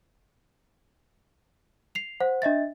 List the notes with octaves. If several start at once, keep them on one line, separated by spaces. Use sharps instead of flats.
C7 F7
C5 F#5
D4 D#5 E5 A6